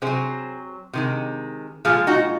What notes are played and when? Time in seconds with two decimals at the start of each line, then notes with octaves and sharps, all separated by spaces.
0.02 C3 F#3 G#4 C5
0.93 C3 D#3 G#3
1.85 A#2 F3 G#3 F4 G#4
2.07 D#4 F#4